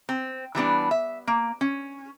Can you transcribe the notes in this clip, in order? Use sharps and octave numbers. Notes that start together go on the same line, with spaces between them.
C4
E3 G3 B3 D4
E5
A#3
C#4